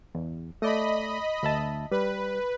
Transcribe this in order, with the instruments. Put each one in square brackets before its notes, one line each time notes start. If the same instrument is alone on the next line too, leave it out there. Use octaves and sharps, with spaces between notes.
[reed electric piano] E2
[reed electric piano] A3 D5 [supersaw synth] D#5 B5
[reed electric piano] D2 E5 A5
[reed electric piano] G3 [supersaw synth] B4